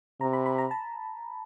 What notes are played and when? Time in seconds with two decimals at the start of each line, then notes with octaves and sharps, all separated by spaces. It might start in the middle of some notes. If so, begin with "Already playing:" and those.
0.21 C3 A#5
0.33 B5
0.46 B5
0.58 A#5
0.71 A5